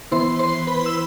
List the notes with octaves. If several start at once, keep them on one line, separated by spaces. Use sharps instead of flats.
E3 B3 E4 C5 C6
C5 C6
B4 B5
E6